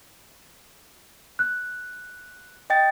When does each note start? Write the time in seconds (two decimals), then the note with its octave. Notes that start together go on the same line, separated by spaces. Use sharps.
1.39 F#6
2.70 D#5 G5 A6